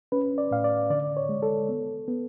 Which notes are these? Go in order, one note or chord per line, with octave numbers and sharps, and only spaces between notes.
C#4 B4
D5
A2 F5
D5
D3 D5
C#5
G#3
A4
B3
B3